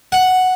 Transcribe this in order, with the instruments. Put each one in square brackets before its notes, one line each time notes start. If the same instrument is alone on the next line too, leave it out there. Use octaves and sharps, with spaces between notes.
[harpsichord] F#5